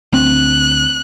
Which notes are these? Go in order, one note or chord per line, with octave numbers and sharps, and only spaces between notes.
D2 C4 F#6